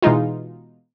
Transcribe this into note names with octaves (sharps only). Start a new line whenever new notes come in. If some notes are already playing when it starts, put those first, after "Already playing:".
B2 E3 G#3 D#4 F4